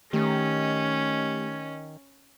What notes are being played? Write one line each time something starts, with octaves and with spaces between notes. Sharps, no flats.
D#3 A3 C#4 G4